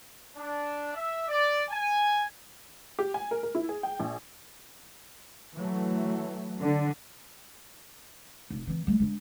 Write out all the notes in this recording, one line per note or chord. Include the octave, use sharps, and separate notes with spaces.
D4
E5
D5
G#5
G4
G#5
A#4
A#4
E4
G#4
G5
A#1
E3 F#3 A3
D3
F1
E3 C4
G3 A3
G#3 D4